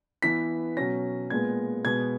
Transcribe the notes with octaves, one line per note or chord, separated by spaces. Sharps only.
E3 B3 B6
B2 F#3 C#4 A#6
A#2 G#3 B3 G#6
B2 G#3 B3 G#6